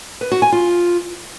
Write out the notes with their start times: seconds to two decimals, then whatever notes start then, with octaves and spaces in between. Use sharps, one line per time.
0.21 B4
0.32 F#4
0.42 G#5
0.52 F4